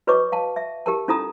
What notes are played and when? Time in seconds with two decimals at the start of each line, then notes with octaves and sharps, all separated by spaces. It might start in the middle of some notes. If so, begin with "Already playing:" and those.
0.07 F#4 B4 C#5 D#5 C#6 D6
0.32 F5 A5
0.56 E5
0.86 G4 A#4 A5
1.08 C#4 D#4 F4 A4 A#5 D#6